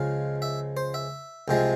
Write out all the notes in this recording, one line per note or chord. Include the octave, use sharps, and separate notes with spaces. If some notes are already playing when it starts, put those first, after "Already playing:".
Already playing: C#2 C#3 F3 G#3 F5
E5
C5
E5
C2 C3 F3 G#3